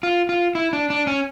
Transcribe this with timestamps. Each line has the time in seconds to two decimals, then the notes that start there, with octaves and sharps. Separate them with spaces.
0.03 F4
0.29 F4
0.55 E4
0.73 D4
0.90 D4
1.07 C#4